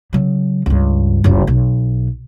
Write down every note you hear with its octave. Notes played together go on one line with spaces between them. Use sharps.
C#3 F#3
C#2 G2
F#1 C#2
B1